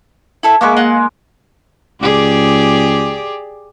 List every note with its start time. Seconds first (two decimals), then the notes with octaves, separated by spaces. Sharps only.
0.43 E4 A4 E5
0.61 G#3 A#3 E5 C#6 D6
0.76 D#5 F5 F#5
2.01 C#2 G4 G#4 D5